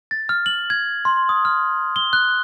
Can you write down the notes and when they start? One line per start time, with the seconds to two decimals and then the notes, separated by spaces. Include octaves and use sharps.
0.11 A6
0.29 F6
0.46 F#7
0.70 G#6
1.05 C6
1.29 D#6
1.45 F6
1.96 G7
2.13 F#6